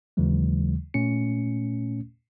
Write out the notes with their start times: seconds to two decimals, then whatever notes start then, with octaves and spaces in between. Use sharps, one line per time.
0.17 D#2 C#3 E3 F#3 G#3
0.94 A#2 A3 C#4 C#7